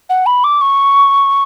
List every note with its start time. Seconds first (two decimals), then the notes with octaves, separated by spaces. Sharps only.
0.09 F#5
0.26 B5
0.43 D6
0.61 C#6